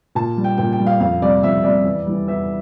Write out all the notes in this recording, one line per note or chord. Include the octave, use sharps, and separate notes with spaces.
A#2 A5
G3
G5
A#2 G5
G5
G3
F5
F2 F5
C3 G3 D5
F2 E5
C3 G3 D5
E2
E3 G3
E2 E5